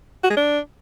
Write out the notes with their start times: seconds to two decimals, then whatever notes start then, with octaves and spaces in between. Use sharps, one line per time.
0.24 F#4
0.30 G#3
0.37 D4